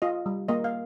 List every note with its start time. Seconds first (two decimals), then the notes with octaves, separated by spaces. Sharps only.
0.02 F4 D#5
0.26 G3
0.48 A#3 D#5
0.64 F5